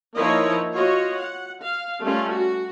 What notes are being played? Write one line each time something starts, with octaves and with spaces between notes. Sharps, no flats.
F3 A#3 D#4 E4 C#5 D#5
F4 F#4 C#5 D#5
F#5
F5
G3 A3 C#4 F4
F#4